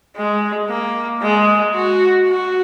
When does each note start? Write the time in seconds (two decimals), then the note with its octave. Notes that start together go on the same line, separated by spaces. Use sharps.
0.16 G#3
0.69 A#3
1.22 G#3
1.74 F#4
2.28 F#4